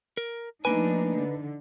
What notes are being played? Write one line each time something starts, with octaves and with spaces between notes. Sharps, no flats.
A#4
F3 A3 A#3 D4 D#4 B4 G#5
D3